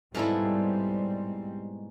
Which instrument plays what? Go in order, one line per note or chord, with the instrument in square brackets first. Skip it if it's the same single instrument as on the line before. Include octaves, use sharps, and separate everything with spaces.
[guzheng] G#2 B2 G#3 [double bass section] G3 C4 [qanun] E4 A4 F5